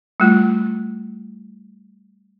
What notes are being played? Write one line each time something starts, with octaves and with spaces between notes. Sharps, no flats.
G3 A3 F4